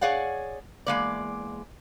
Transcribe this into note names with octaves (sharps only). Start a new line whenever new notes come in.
G#4 C#5 D5 F5 F#5
E2 G#3 A#3 D5